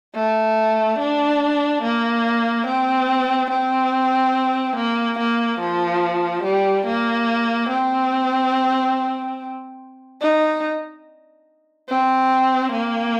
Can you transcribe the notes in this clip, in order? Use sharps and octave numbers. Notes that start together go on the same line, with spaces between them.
A3
D4
A#3
C4
C4
A#3
A#3
F3
G3
A#3
C4
D#4
C4
A#3